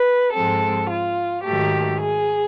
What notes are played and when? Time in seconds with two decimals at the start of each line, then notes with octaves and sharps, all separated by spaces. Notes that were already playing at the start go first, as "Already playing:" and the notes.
Already playing: B4
0.33 G#2 F3 G#3 C4 A4
0.89 F4
1.44 G#2 D#3 F#3 A3 G4
2.01 G#4